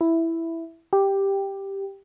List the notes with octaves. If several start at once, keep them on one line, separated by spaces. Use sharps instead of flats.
E4
G4